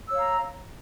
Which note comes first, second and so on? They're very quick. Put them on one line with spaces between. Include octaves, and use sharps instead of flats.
E6 C#5 F5 A#5